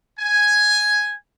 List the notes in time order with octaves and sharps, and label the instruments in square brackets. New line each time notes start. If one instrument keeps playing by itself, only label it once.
[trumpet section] G#5